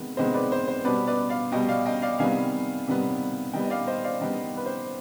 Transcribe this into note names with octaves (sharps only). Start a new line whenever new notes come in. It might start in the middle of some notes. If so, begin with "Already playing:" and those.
Already playing: C3 D#3 G#3 B3
C3 D#3 G#3 B3 C5 D#5
B4 D5
C5
C5
B2 G3 B3 B4 D5
B4 D5
D5 F5
B2 G3 B3 D#5 G5
D5 F5
D#5 G5
D5 F5
C3 D#3 G3 B3 F5 G#5
C3 D#3 G3 B3
D#3 G3 B3 D#5 G5
D#5
D5 F5
C5 D#5
D5 F5
D#3 G3 B3 D#5 G5
B4
C5